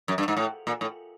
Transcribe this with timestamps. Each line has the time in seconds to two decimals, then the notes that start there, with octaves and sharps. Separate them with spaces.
0.08 F#2
0.18 G2
0.28 G#2
0.37 A2
0.67 A#2
0.81 A2